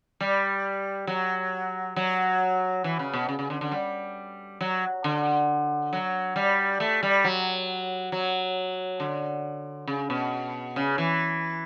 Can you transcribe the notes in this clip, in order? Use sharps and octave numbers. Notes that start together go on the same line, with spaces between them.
G3
F#3
F#3
E3
C#3
B2
C#3
C#3
D3
D3
G3
F#3
D3
F#3
G3
A3
G3
F#3
F#3
D3
C#3
B2
C#3
E3